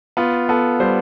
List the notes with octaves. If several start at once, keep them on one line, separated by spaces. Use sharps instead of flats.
B3 F4
B3 A4
G3 C5